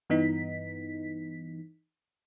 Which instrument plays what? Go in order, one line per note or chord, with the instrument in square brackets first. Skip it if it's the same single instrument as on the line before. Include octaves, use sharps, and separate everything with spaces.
[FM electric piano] G2 E3 B3 D#4 B6